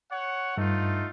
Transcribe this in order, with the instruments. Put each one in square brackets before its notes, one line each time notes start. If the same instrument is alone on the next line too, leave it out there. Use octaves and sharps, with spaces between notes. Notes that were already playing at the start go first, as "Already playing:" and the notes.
[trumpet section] C#5 F#5
[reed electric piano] G2 [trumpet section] A3 D#4 F4